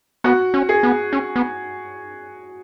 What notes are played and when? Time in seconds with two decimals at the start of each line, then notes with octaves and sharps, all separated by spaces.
0.24 B3 F#4
0.54 C#4
0.69 G#4
0.83 B3
1.13 C#4
1.36 B3